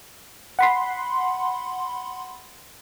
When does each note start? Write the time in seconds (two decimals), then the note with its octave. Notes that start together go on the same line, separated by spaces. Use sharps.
0.59 F#5 B5 C6